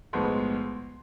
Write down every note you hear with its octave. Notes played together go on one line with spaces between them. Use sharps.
B1 A2 F3 G#3 B3 C6